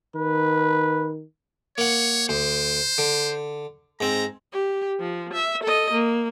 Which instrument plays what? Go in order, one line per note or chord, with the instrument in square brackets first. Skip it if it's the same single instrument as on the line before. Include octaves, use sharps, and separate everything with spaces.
[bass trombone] D#3 [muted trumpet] B4
[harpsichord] A#3 F#5 [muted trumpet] C#5
[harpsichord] D2 [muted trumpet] C5
[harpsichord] D3
[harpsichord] G#2 C4 [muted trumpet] A#5
[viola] G4
F3
E5
A4 D#5
A#3